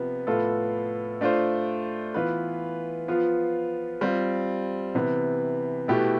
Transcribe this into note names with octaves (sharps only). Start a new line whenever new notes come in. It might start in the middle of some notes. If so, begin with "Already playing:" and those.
Already playing: C3 F3 B3
A2 F3 B3 F4 A4
A3 D4 F4 C5
E3 B3 F4 B4
F3 B3 F4
G3 C4 F4
C3 E3 B3
B2 A3 E4 G4 B4